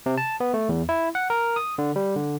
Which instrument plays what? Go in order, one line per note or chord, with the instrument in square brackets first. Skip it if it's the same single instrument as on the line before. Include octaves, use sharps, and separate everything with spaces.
[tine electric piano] C3
A5
B3
A3
E2
E4
F#5
A#4
D#6
D3
G3
D3